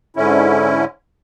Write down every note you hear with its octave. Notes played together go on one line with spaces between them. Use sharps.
G#2 D3 C#4 E4